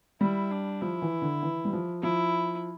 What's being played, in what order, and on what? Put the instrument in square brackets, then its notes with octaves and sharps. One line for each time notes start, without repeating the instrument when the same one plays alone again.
[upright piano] G3 [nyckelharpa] E4
[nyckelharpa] D4
[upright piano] F3 [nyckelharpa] E4
[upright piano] E3
D3
E3
G3
F3
[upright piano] F3 [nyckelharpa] E4